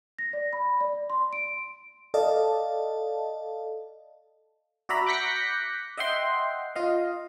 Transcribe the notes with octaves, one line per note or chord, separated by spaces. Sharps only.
A#6
D5
B5
D5
C6
D7
A4 D5 D#5 F5 A5
F#4 D5 E5 A#5 B5
D6 F#6 G6 A#6 B6 C#7
D#5 E5 F#5 G5 C6
F4 D#5 F5